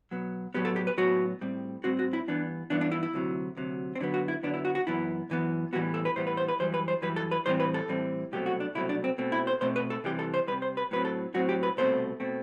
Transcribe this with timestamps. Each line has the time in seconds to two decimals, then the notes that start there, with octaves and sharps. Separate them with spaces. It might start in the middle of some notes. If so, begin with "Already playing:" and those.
0.11 B2 F#3 B3
0.54 A2 F#3 B3 G4
0.65 A4
0.76 G4
0.87 B4
0.98 A2 F#3 B3 F#4
1.41 A2 G3 C4
1.84 A2 G3 C4 F#4
1.99 F#4
2.13 E4
2.28 G2 E3 B3 D4
2.70 G2 E3 B3 D4
2.81 D4
2.92 E4
3.03 E4
3.13 D2 C3 F#3
3.57 D2 C3 F#3
3.95 C4
4.00 F#2 D3 F#3 B3 D4
4.14 F#4
4.28 E4
4.43 F#2 D3 F#3 B3 D4
4.54 E4
4.65 F#4
4.75 F#4
4.87 F#2 E3 B3 E4
5.30 F#2 E3 B3
5.73 A2 E3 G3 B3 F#4
5.94 A4
6.05 B4
6.16 A2 E3 G3 B3 C5
6.27 B4
6.37 C5
6.48 B4
6.59 F#2 E3 G3 C5
6.74 B4
6.88 C5
7.02 F#2 E3 G3 B4
7.16 A4
7.31 B4
7.46 A2 E3 G3 C4 C5
7.60 B4
7.74 A4
7.88 A2 E3 G3 C4
8.32 C2 B2 F#3 A3 C4 G4
8.46 F#4
8.60 D4
8.75 C2 B2 F#3 A3 C4 E4
8.89 D4
9.04 C4
9.18 B2 A3 C4
9.32 E4
9.47 C5
9.61 B2 A3 C4 C5
9.76 B4
9.90 A4
10.04 C2 C3 E3 G3 G4
10.19 A4
10.34 C5
10.47 C2 C3 E3 G3 B4
10.62 C5
10.77 B4
10.91 A2 F#3 C4 B4
11.05 A4
11.34 A2 F#3 C4 F#4
11.49 G4
11.63 B4
11.77 C2 B2 A3 C4 C5
12.20 B2 A3 C4